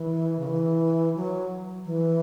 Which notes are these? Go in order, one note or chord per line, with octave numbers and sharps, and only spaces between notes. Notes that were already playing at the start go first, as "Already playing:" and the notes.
Already playing: E3
C#3
E3
F#3
E3